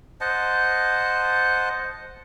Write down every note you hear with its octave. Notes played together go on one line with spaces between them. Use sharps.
C5 D#5 F#5 A5